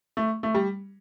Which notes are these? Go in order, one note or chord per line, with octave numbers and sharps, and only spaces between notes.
A3
A3
G3